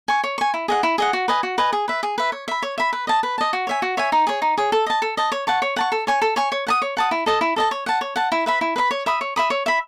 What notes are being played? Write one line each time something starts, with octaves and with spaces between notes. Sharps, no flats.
G#5 C#6
C#5
G#5 C#6
E4
G#4 D#5 F#5
E4
G#4 D#5 F#5
F#4
B4 D#5 G#5
F#4
B4 D#5 G#5
G#4
B4 E5
G#4
B4 E5
C#5
E5 B5
C#5
E5 B5
B4
D#5 A5
B4
D#5 A5
F#4
C#5 E5 G#5
F#4
C#5 E5 G#5
D#4
G#4 C#5
D#4
G#4 C#5
A4
D#5 A5
A4
D#5 A5
C#5
F#5 A5 C#6
C#5
F#5 A5 C#6
A4
C#5 G#5 C#6
A4
C#5 G#5 C#6
C#5
F#5 A5 D#6
C#5
F#5 A5 D#6
E4
A4 D#5 A5
E4
A4 D#5 A5
C#5
F#5 A5
C#5
F#5 A5
E4
B4 E5 B5
E4
B4 E5 B5
C#5
E5 B5 D#6
C#5
E5 B5 D#6
C#5
E5 B5